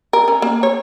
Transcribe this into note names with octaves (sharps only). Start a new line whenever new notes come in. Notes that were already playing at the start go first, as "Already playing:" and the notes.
A#4
C#4
A#3
C#5